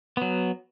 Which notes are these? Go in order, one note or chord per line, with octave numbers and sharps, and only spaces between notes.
F#3 B3